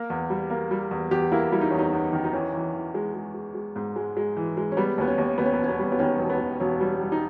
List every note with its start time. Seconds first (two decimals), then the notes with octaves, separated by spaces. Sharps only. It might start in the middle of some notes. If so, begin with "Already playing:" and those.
Already playing: A#3 A#4
0.10 E2
0.30 G3
0.50 A#3
0.71 G3
0.91 E2
1.11 E2 G4
1.32 A#3 E4
1.52 G3 E4
1.61 D#4
1.70 E2 C#4
1.79 D#4
1.93 E2
2.13 D#3
2.24 D#4
2.33 E3 C#4
2.53 E3
2.74 E3
2.94 G#3
3.15 G#3
3.34 G#3
3.55 G#3
3.76 G#2
3.96 G#3
4.17 G#3
4.36 E3
4.57 G#3
4.72 C#4
4.77 G3 B3
4.98 D#2 B3
5.08 C#4
5.18 D#2
5.38 D#2 B3
5.46 C#4
5.54 E1 B3
5.64 C#4
5.69 B3
5.79 G3
5.92 B3
5.99 D#3 C#4
6.19 E1
6.30 B3
6.40 E1
6.60 E1 C#4
6.80 G3
7.01 G3
7.12 D#4